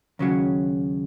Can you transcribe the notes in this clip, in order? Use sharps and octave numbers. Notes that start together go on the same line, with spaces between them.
D#2 C#3 F#3